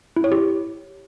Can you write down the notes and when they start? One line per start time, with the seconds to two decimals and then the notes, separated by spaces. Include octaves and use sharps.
0.16 E4
0.24 C#5
0.32 G4